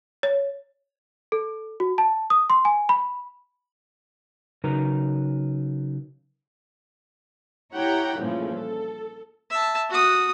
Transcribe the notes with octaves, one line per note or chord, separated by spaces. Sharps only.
C#5
A4
F#4
A5
D#6
C6
G#5
B5
C#3 F#3 D#4 A#4 B4 A#5
E4 G4 C#5 F#5 G5 A#5
G2 A#2 C#3 E3 F3 A3
A4
E5 A5
F#4 D#6